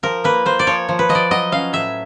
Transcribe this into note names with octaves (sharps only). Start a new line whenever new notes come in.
F3 A#4
A#3 B4
A#3 C5
D5
F3 C#5
F3
B4
F3 D#5
D5
F#3 D#5
C#4 F5
A2 E5